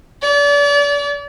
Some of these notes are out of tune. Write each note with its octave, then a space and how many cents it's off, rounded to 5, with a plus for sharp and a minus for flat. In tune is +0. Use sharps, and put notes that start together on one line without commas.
D5 -35